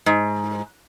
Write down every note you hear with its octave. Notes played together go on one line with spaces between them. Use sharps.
G#2